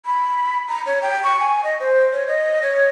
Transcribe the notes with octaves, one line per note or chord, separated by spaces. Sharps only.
B5
A#5
C#5
G5
C#6
G#5
D#5
C5
C#5
D#5
C#5